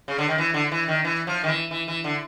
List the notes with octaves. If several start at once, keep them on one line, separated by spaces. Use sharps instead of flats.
C#3
D3
D#3
E3
D3
E3
D#3
E3
F3
D#3
E3
E3
E3
D3